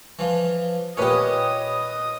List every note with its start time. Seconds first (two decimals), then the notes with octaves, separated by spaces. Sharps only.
0.19 E3 F3
0.97 A#2 C#4 G4 B4 C#5 D#5 D#6